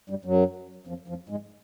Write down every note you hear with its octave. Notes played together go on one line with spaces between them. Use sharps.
G2 G3
F#2 F#3
F2 F3
F2 F3
G#2 G#3